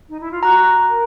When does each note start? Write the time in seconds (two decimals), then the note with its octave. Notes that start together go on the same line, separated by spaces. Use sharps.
0.09 D#4
0.20 E4
0.31 F4
0.42 F#4 A#5
0.89 A#4